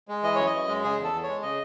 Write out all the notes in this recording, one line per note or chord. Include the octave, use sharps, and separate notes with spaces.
G#3
E3 D#5
F#2 C#5
D#5
F#2
G#3
C#3 G#4
E2
A4
E2
C#5
G#3
C#3 D#5